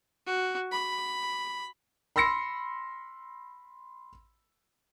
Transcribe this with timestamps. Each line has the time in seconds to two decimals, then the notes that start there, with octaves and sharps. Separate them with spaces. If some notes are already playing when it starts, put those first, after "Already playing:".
0.26 F#4
0.72 B5
2.16 B5 C6 E6 A#6 C7 C#7